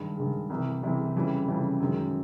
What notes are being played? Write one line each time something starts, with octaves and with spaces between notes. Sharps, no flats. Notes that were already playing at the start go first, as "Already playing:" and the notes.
Already playing: G2 D#3 G#3
G2 D#3 G#3
C2 C3 E3
C2 C3 E3
F2 C#3 E3 G3
F2 C#3 E3 G3
F#2 D#3 G#3